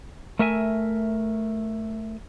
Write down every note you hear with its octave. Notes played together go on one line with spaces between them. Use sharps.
A3 A#4 E5 G#5